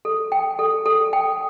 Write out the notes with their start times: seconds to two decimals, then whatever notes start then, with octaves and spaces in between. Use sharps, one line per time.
0.05 A4
0.32 G5
0.59 A4
0.86 A4
1.13 G5